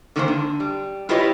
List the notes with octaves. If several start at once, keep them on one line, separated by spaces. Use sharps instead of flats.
D3 D#3 G#3 A#3 F#4 C5
D3
G3
E4 F4 G4 B4 C#5 D#5